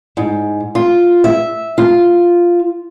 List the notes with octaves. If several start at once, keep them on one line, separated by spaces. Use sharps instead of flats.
G#2
F4
E5
F4